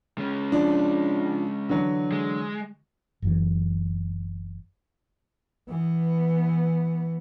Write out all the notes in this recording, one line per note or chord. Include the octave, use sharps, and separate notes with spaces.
G#3 C#4
F3 D4
D3 E3 F#3
G#3
F#1 F#2 E3
E3 B3